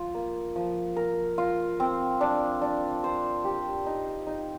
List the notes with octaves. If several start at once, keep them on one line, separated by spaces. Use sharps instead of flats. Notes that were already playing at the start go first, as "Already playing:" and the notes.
Already playing: F3 F4
A#3
F3
A#4
F4
C4
D4
D4
C5
G4
D#4
D#4